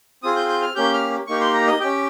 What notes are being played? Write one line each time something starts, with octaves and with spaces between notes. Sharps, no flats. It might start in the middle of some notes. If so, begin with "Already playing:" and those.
C4 F4 G#4 D#6
G6
G6
F6
A#3 C#4 G4 G6
F6
A#3 D#4 G4 C#6
C6
A#5
D#5
C#4 G4 G5